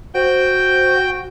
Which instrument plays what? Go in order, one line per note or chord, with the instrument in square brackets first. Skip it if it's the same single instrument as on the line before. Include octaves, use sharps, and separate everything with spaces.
[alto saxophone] F#4 [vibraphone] C5 [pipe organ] G5